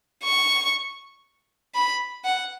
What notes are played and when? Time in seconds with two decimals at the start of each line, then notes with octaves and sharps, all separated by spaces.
0.24 C#6
1.75 B5
2.25 F#5